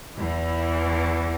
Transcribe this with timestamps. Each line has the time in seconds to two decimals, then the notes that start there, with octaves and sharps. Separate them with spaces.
0.16 E2 E3